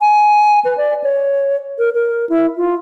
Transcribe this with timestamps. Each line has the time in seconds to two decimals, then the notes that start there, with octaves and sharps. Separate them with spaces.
0.01 G#5
0.65 B4
0.78 D5
1.04 C#5
1.78 A#4
1.94 A#4
2.29 E4
2.57 F4